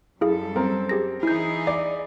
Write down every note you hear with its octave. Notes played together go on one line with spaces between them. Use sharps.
F#2 G3 E4 G#4 A4 F5
C4 A#4
G4 G#4 A#6
E3 D#4 E4 G#4 G6
D5